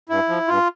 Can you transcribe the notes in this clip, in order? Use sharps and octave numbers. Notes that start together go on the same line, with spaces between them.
G2 E4
F3
G2 F4